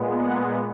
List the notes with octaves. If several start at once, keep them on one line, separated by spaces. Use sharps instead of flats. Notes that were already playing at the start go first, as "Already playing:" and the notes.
Already playing: A#2 G#3 B3
F#5